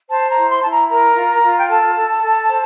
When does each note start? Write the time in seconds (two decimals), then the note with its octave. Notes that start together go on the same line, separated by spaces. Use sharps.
0.10 C5 A5
0.30 A#5
0.37 E4
0.50 C6
0.63 E4 A5
0.70 A#5
0.90 A#4 A#5
1.16 F4
1.43 F4
1.58 G5
1.69 A4 A5
1.95 A4
2.22 A4
2.48 C5